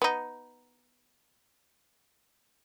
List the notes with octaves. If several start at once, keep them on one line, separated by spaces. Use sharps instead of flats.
B3 D#4